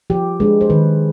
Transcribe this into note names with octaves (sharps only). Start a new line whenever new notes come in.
F3 G4
G#3 D4 B4
C5
D#3 B4